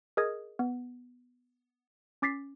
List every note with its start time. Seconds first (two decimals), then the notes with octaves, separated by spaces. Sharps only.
0.17 G#4 A#4 D#5 D#6 G#6
0.59 B3
2.22 C#4 D6 A6 B6 C7